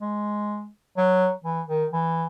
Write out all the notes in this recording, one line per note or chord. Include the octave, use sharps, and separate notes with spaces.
G#3
F#3
E3
D#3
E3